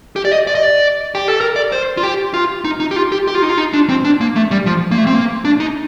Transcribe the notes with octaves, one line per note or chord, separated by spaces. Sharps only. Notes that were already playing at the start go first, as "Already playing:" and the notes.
G4
D5
D#5
D5
D#5
D5
G4
A4
A#4
D5
C5
F4
G4
F4
D#4
D#4
G4
F4
G4
G4
F4
D#4
F4
D#4
D4
C4
D4
A#3
A3
G3
F3
A#3
A3
C4
A#3
D4
D#4